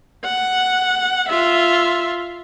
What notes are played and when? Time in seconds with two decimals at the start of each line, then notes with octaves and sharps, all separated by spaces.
0.25 F#5
1.29 F4 E5